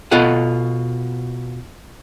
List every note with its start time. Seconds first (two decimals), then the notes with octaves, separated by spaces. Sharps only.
0.11 B2 F4 A4 D#5 F#5